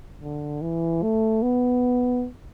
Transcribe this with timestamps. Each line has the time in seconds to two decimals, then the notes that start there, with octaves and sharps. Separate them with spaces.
0.21 D3
0.62 E3
1.02 A3
1.42 B3